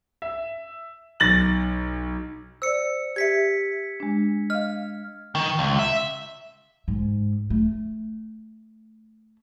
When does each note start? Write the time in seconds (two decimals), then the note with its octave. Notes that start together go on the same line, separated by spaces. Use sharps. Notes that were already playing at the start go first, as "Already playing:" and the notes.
0.22 E5
1.20 B1 A6 A#6 F#7
2.62 C5 D5 E6 C#7
3.16 G4 E5 G#6 B6 C#7
4.00 G#3 D4
4.50 D#5 F5 F6
5.35 D#3
5.59 C#2
5.79 E5
6.88 G#2
7.50 A3